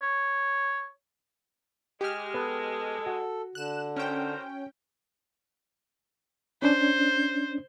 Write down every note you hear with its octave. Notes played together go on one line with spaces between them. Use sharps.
C#5
G#3 G4 F6
B3 A4
F#4
D3 F#6 E7
A2 C#4 A#4 C5 G5
C#4 D4 C5